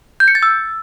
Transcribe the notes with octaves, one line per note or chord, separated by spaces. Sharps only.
G6
C#7
A6
E6